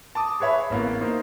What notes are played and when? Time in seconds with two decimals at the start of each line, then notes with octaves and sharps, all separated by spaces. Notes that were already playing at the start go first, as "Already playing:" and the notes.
0.15 A5 D6 D#6
0.40 G#4 B4 C#5 E5 B5
0.70 A1 A#3 B3
1.01 A#3 D#4 C5